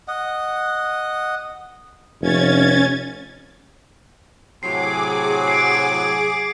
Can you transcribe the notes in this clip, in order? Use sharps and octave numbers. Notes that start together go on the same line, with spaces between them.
D#5 F#5
F1 C#4 G#6 A6
A2 C3 F#3 G#4 D6 C7
C7 D7